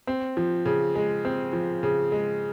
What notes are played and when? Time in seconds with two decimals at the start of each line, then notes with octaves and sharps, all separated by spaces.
0.07 C4
0.37 F3
0.66 C#3
0.95 G#3
1.25 C4
1.53 F3
1.83 C#3
2.12 G#3